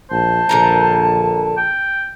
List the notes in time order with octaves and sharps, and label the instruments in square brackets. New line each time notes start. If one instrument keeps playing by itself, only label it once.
[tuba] A#1 [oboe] C5 [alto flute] A5
[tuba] A#1 [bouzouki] D3 A#3 A#5
[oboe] G5